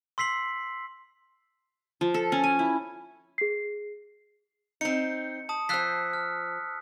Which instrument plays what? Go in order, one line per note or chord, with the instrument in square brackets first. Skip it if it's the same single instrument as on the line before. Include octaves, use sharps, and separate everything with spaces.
[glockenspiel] C6 E6 B6 C7 F#7
[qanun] F3
A4
C#4
G#5
E4
[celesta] G#4 C7
[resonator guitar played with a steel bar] C4 D#4 [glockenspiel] C#7
[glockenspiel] A5 D#6
[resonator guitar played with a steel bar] F3 C5 [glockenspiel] E6 F#6 B6
[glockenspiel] F6